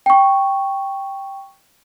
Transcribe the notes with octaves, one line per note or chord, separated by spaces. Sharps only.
G5 C#6